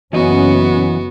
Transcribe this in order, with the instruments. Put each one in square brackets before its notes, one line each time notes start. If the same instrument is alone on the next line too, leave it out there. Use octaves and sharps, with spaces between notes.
[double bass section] F#1 C#4 [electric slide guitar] E3 D#5 [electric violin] B3 F#4